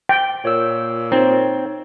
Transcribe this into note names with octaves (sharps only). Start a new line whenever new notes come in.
G5
A#2 C#5 E6
C4 D#4 C#5